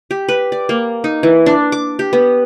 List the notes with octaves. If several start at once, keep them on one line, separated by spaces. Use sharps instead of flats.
G4
B4
D5
A#3
D#4
E3
D4
D6
G4
B3